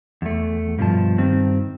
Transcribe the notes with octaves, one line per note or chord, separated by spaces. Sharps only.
E2 A3
G2 B2 F3 A5
G2 D#3 C4